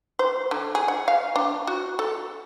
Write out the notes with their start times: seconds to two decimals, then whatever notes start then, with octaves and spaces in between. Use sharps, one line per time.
0.19 C5
0.51 D3
0.75 G#4
0.88 F#5
1.08 F5
1.36 D4
1.67 F#4
1.99 A4